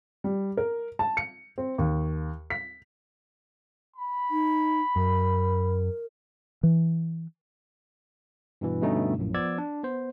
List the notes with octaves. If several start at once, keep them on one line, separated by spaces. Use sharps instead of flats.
G3
A#4
A5
C#7
C4
D#2
B6
B5
D#4
F#2 A#4
E3
G2 B2 E3
G2 B2 D3 A3 C#4 D#4
A#1 F#2 A2
F3 B3 D5 E6 G#6
D4
B3 C5